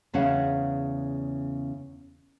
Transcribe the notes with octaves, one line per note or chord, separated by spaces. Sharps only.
E2 C#3 C#4 F#5